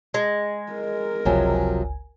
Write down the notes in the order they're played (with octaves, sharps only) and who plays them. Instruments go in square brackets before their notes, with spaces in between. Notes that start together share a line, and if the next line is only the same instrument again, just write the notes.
[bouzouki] G#3
[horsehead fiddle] A#4
[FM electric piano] G1 C#2 G#5 [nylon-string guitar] C3 F3 F#3